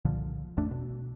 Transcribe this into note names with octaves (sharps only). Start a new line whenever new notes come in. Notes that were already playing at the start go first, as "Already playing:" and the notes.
C2 A#2 D3 F3
A1 E2 A3 D4
B2